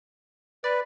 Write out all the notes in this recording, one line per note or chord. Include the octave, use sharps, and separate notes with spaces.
B4 D5